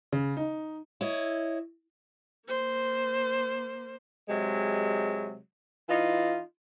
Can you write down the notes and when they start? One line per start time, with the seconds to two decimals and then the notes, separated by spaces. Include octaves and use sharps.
0.12 C#3
0.37 D#4
1.01 E4 C#5 D#5
2.48 A#3 C5
4.29 C3 F#3 G#3
5.89 E3 D#4 F4